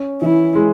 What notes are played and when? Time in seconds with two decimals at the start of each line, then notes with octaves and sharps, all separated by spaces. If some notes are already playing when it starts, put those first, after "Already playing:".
Already playing: C#4
0.21 E3 E4
0.55 G#3